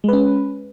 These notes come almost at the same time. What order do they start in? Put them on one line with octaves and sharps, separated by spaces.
G#3 B4 C#4